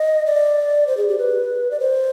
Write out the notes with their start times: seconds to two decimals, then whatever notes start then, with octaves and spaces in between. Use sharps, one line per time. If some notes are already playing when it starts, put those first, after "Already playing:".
Already playing: D#5
0.26 D5
0.87 C5
0.97 G#4
1.08 G4
1.18 B4
1.71 D5
1.80 C5